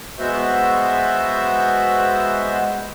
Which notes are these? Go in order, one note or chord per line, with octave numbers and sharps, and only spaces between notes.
G#3 B3 F#4 C5 E5